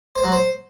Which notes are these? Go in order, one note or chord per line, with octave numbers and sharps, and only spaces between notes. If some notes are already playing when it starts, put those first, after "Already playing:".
C5
F#3
C5